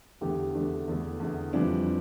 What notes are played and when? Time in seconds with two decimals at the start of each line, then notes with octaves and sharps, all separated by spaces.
0.21 E2 D3 A3 G4
0.55 E2 D3 A3 D4
0.87 E2 D3 A3
1.20 E2 D3 A3
1.53 F2 E3 G3 D4